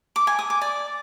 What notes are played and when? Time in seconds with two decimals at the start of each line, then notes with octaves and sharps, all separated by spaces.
0.16 D6
0.27 G#5
0.39 D#6
0.50 D6
0.61 D5